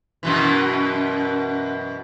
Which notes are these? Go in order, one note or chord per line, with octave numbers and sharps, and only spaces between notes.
F#2 B2 E3